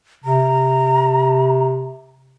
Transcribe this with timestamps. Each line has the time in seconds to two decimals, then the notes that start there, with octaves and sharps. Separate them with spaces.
0.25 C3 A#5